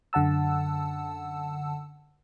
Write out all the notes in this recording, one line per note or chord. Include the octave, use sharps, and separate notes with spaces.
F#2 D3 F#5 A5 E6